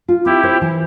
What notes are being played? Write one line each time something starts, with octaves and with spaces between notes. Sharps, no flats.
F4
C4 E4 G4
C5
E3